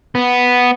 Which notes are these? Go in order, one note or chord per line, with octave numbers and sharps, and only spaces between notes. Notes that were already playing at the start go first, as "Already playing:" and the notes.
B3